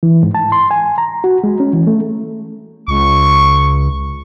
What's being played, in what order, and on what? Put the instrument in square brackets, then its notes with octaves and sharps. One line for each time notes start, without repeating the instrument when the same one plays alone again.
[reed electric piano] E3
G#2
A5
C6
G#5
A#5
F#4
G#3
C#4
E3
A3
[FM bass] C#2 [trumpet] C#6